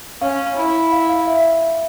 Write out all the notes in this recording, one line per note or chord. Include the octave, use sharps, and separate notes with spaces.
C#4 F5
E4
F5
F5
E5